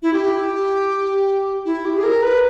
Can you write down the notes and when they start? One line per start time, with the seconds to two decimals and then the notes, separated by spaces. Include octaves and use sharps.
0.02 E4
0.13 G4
1.65 E4
1.85 G4
1.97 G#4
2.03 A#4
2.23 B4